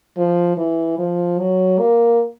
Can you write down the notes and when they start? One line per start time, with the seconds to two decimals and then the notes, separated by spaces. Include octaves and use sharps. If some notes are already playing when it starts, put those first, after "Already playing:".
0.17 F3
0.57 E3
0.98 F3
1.39 F#3
1.79 A#3